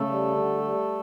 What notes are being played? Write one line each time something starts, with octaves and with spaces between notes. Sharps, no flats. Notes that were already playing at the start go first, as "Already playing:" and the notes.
Already playing: C#3 A3 A4
G3
D3
G3